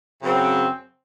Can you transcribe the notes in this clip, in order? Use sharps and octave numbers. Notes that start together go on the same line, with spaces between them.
F#2 C#3 F#3 C4